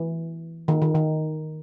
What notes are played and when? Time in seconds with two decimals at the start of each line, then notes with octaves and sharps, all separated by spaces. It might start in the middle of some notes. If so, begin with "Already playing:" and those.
Already playing: E3
0.68 D#3
0.82 D#3
0.95 D#3